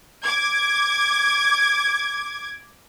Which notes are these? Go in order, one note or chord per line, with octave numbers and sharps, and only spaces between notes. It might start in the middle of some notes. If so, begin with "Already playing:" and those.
D6 G#6